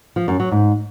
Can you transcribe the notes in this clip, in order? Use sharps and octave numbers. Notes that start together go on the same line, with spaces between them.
F3
F#2
F#3
G#2